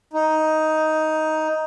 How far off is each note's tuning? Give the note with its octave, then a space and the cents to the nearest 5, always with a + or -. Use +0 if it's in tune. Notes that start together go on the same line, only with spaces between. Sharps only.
D#4 +10